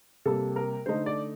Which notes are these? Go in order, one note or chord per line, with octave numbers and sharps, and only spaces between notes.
C3 G3 A#3 A4
A#4
D3 A3 D#4 C5
D5